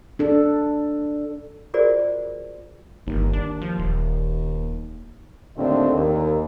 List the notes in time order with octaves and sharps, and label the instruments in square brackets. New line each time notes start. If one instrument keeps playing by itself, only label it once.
[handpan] D4 A4
[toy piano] F4 F#4 G#4 A#4 C5 D5
[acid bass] G1 [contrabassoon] D#2
[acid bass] D4
F3
D#1
[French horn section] D#2 A2 D3 C4 D4 D#5
D#2